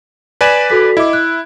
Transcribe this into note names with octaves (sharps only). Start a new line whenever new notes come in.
B4 D5 G#5 B6 E7 F#7
F#4 A4 B6
E4 D#5 D6
F#6